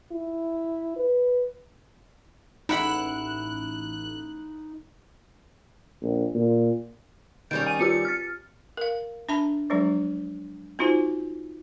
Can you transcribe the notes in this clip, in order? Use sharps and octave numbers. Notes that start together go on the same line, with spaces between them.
E4
B4
A1 D#4 E4 F#5 B5 F#6
A#1
A#2
D#3 G3 C#4 G6 D7
G#5 D#7
C4 F4 G4 C#7
F6 A6
A#4 F5
D4 E5 A5 B5
F3 F#3 G#3 D4
C4 D#4 F4 F#4 C5